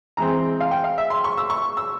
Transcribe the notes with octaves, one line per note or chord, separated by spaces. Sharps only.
E3 G#3 C4 A#5
F5
G5
F5
E5
C6
C#6
E6
C#6
E6